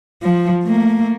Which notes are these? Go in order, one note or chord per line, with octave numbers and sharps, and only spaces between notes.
F3
A3 A#3